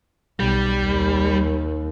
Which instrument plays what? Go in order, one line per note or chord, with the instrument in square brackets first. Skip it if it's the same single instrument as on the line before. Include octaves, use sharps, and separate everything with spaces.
[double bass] B1 [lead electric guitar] G3
[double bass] D#2